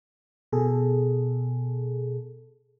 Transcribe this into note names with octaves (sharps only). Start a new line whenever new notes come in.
B2 G#4 A4